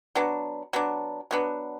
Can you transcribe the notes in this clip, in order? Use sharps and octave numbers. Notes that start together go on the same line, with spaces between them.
F#3 B3 D4
F#3 B3 D4
F#3 B3 D4